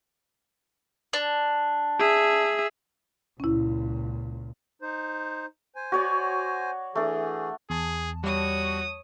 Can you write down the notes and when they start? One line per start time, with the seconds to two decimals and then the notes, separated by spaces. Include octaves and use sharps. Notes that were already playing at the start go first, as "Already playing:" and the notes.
1.13 D4
1.99 G#4 E5
3.40 C#2 A#2 C#4 E4
4.82 D#4 C5
5.76 C5 G#5
5.92 F#4 C#5 D5
6.95 E3 A3 D4 G#4
7.70 E2 G#4 A5
8.24 G3 F#4 C#5 D#6